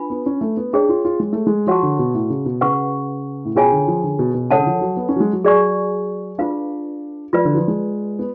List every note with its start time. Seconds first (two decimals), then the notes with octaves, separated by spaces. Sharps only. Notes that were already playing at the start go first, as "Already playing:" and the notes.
Already playing: D4 F4 B4 B5
0.10 B3
0.26 C#4
0.41 A3
0.57 B3
0.73 C#4 D4 G#4 C#5
0.89 F4
1.05 F4
1.20 G#3
1.33 A3
1.47 G#3
1.67 F3 F#4 C#5 F#5 A5 C#6
1.83 D3
1.99 B2
2.14 A2
2.30 C#3
2.46 B2
2.61 C#3 B4 F#5 C#6
3.45 A2
3.55 B2 C#4 F4 G#4 C#5 G#5
3.72 D3
3.88 F3
4.03 D3
4.19 B2
4.34 B2
4.50 C#3 A4 C#5 F#5 A5
4.59 D3
4.66 F3
4.81 F#3
4.97 B3
5.09 C#4
5.16 F#3
5.20 G#3
5.33 F#3
5.44 F#3 G#4 D5 G#5 C#6
6.38 D4 F4 B4 F5
7.33 F3 F4 B4 D5
7.45 D3
7.52 F#3
7.56 F3
7.68 G#3
8.19 B3